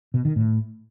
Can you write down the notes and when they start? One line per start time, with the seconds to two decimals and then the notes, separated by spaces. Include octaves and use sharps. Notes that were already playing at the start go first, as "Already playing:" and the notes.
0.14 B2
0.25 D#3
0.36 A2